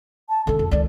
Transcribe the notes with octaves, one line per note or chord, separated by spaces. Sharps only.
A5
D3 C#4 A4
F2
C#2 D#3 D5